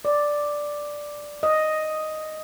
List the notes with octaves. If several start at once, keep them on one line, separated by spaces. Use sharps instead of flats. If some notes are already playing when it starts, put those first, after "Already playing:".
D5
D#5